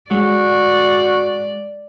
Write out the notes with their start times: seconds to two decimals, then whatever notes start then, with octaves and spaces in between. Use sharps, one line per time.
0.11 G#3 F#4 D5